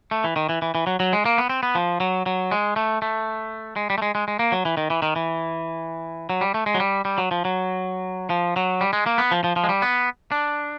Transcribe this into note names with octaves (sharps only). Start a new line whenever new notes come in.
A3
E3
D#3
E3
E3
E3
F#3
F#3
G#3
A#3
B3
C4
B3
F3
F#3
F#3
G#3
A3
A3
G#3
G3
A3
G#3
G#3
G#3
A#3
F#3
E3
D#3
E3
D#3
E3
F#3
G3
A3
G#3
F#3
G3
G3
F#3
F3
F#3
F3
F#3
G3
G#3
A#3
B3
F3
F3
F3
G#3
G3
B3
D4